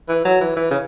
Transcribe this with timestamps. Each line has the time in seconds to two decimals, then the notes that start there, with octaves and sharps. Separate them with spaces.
0.09 E3
0.25 F#3
0.41 E3
0.56 E3
0.71 C#3